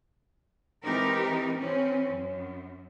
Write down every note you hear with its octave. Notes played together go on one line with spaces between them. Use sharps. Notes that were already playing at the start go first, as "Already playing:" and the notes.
E3 G#3 C4 D#4 G4 A#4
E3 C4 C#4
F#2